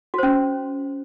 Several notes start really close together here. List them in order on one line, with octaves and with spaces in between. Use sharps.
F#4 C5 C#4